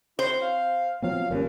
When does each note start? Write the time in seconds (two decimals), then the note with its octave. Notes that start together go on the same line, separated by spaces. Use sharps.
0.19 C4 E4 F#4 C5 C#5
0.42 F5
1.02 F3 F#3 B3 C4 F5
1.30 G1 D#2 A#2 C#3 C#4